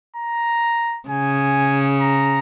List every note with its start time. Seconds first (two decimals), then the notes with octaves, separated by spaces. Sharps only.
0.16 A#5
1.09 C#3 G#5
2.01 A#5